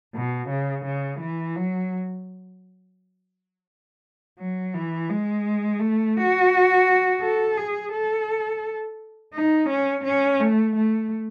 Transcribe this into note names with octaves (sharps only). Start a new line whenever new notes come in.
B2
C#3
C#3
E3
F#3
F#3
E3
G#3
A3
F#4
A4
G#4
A4
D#4
C#4
C#4
A3
A3